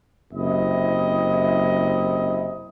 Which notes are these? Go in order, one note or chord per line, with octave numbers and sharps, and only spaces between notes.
F#1 C3 E4 D#5